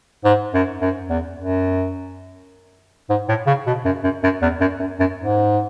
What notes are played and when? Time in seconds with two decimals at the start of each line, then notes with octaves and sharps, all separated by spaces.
0.24 G#2
0.54 F#2
0.81 F#2
1.10 E2
1.39 F#2
3.10 G#2
3.29 A2
3.47 C#3
3.67 B2
3.85 F#2
4.04 F#2
4.23 F#2
4.42 E2
4.61 F#2
4.80 F#2
5.00 F#2
5.19 G#2